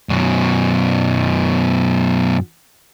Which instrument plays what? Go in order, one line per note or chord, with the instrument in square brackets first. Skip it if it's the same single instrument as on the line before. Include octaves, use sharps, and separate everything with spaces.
[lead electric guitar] F#2 B2